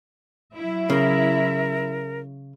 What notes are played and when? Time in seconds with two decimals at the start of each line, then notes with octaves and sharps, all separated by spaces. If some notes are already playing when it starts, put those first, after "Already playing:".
0.56 F#3 E4 E5
0.90 C#3 A#4